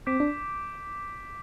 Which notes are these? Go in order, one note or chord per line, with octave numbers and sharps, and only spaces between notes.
C4 D6 G6 B6 D7
D4